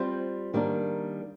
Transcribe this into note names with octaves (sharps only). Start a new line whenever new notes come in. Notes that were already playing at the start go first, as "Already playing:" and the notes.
Already playing: G3 C4 F4 C5
D#3 G3 A#3 D4